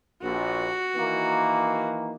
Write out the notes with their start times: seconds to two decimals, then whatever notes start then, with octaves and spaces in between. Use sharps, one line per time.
0.22 A#1 F#4
0.95 D#3 E3 A#3